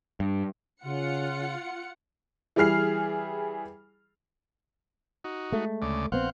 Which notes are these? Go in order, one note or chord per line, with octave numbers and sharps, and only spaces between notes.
G2
C#3 F4 F#5 C#7
E3 G3 G#4 F6 C7
D#4 F#4
G#3 A3
D2 C#3 D5
A#1 B3 C4 C5 F5 F#5